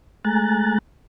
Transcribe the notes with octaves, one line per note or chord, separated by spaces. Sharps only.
G#3 A3 G#5 A#5 F#6 A6